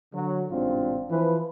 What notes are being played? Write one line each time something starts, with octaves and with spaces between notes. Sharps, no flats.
D3 F#3
A1 G#2 C3 C4 D4 F4
E3 F3 B4